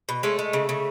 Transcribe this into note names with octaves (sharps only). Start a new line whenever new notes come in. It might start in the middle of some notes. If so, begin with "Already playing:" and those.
B2
G#3 A3 C#4
G#3
C#3
C#3